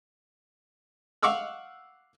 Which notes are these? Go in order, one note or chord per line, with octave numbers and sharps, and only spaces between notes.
F5 F#5 C#6 D6 E6 F6